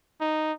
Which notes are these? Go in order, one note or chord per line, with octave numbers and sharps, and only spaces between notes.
D#4